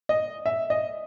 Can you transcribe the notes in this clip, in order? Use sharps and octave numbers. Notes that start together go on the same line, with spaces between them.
D#5
E5
D#5